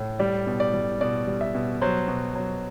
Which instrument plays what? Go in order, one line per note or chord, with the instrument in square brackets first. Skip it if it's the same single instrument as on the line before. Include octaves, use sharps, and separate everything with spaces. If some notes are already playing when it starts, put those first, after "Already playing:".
Already playing: [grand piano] A2
G3 D5
B2
D5
G3
B2 D5
G3
E5
B2
F#3 C5
B2
F#3